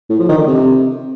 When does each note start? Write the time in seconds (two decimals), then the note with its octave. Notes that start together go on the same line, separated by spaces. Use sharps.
0.10 A2
0.19 F3
0.29 D#3
0.38 D3
0.48 C3